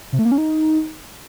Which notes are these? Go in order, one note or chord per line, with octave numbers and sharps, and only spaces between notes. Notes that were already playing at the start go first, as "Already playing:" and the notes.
C3
A3
A#3
C#4
D#4